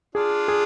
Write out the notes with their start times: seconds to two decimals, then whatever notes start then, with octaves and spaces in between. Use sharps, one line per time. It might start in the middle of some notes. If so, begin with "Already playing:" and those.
0.15 D4 F4 G#4
0.48 G#4